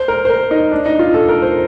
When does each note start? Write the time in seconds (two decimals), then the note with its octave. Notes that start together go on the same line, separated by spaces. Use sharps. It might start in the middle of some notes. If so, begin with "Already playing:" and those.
Already playing: C5
0.08 A#4
0.25 C5
0.30 A#4
0.51 D#4
0.71 D4
0.86 D#4
0.99 F4
1.14 A4
1.29 A#4
1.42 C5